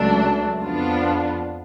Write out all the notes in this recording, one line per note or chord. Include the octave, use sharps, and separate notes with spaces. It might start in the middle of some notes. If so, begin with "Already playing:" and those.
Already playing: C#2 C#3 F#3 A3 D4
F2 F3 B3 D4 F4